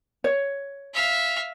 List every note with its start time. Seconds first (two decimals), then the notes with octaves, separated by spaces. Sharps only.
0.24 C#5
0.94 E5 F5